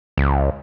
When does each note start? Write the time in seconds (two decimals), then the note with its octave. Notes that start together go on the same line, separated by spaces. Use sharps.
0.17 C#2